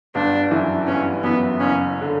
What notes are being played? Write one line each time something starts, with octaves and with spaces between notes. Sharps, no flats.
G1 D4
F#2 E3
G1 C#4
F#2 E3 B3
F#1 C#4
D3